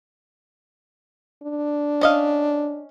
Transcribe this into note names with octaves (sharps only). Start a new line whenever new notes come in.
D4
C#4 D#5 F5